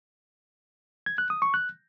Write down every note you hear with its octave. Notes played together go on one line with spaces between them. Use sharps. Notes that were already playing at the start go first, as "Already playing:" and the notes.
G#6
F#6
D#6
C#6
F#6